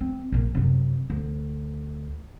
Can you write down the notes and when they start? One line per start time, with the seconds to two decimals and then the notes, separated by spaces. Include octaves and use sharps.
0.01 C4
0.32 A#1 A#2
0.55 F#2 C3
1.10 D2